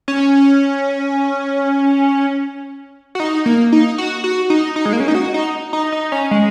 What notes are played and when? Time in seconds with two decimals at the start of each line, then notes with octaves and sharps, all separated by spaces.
0.08 C#4
3.15 F#4
3.20 D#4
3.46 A#3
3.72 D#4
3.98 F#4
4.24 F#4
4.50 D#4
4.76 D#4
4.85 G#3
4.93 A#3
5.00 C#4
5.08 D#4
5.15 F#4
5.34 D#4
5.73 D#4
5.92 D#4
6.12 C#4
6.31 G#3